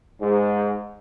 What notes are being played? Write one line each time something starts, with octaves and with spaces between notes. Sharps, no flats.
G#2